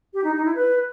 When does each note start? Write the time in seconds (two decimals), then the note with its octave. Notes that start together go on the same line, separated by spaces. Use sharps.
0.14 G4
0.24 D#4
0.35 D#4
0.45 E4
0.55 B4